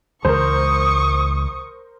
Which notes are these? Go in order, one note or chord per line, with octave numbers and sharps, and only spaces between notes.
C#2 E3 G#3 A#4 C5 C#6 D#6